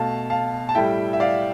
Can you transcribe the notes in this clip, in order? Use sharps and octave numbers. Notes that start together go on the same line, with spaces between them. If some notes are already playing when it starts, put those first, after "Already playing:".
Already playing: B2 A3 F5 A5
F5 A5
A5
A2 G3 E5 G5
E5
D5 F5